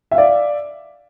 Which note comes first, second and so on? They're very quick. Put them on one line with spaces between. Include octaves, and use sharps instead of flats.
E5 F5 D5